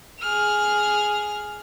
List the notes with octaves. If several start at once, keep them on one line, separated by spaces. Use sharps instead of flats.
G#4 F6